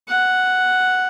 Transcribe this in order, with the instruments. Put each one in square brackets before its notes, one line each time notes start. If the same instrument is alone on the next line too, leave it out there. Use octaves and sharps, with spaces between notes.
[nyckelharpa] F#5